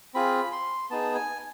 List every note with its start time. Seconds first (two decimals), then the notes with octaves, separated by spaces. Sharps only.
0.14 C4 F4 G#4 B5
0.52 C6
0.90 B3 D#4 G#4 A5
1.15 G#5